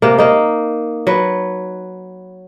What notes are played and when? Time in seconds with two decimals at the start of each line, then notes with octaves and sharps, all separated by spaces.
0.02 C3 A#3
0.18 A#3 D#4
1.07 F#3 B4